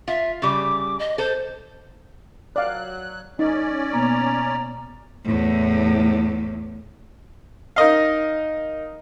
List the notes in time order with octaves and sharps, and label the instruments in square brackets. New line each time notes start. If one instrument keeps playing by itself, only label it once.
[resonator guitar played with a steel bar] F4 [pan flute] E5
[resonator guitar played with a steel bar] C#3 G3 [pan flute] D6
[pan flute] D#5
[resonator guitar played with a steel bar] A4 [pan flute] C5
[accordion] F#3 F#6 [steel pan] D5 F5
[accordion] C#4 D5 [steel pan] D#4
[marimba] B2 A#3 B3 [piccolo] A#5
[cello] E2 A2
[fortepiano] D#4 A#4 D#5 F5